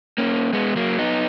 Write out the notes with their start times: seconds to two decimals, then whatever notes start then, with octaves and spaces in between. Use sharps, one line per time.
0.18 A#3 C#4
0.53 G#3 B3
0.76 F#3 A#3
0.99 B3 D#4